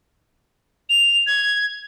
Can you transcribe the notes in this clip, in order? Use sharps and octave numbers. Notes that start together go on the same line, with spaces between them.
F7
G#6